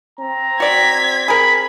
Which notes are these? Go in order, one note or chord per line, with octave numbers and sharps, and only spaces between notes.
C4 A#5
F#4 D5 G#6 B6
G#4 A#4 B5